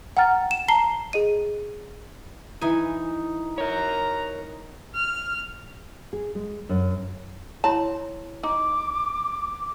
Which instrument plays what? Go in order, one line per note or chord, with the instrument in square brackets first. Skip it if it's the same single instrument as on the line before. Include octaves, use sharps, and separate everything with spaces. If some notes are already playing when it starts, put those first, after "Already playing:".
[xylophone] F#5 G5 A#5 F6 A6
E7
A5 A#5 C7 G7
G#4 D#5 D#7
[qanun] E3 G#5 [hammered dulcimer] D#4
[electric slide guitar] A#4 C#5 [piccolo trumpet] A#5
[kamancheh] F6
[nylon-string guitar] G#4
G#3
F#2
[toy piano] E4 C#5 C6 [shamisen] A5
[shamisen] D#4 [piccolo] D6